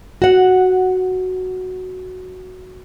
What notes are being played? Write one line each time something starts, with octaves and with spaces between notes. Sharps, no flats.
F#4 F#5